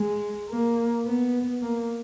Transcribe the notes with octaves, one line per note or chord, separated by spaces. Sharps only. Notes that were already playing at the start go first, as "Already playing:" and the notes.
Already playing: G#3
A#3
B3
A#3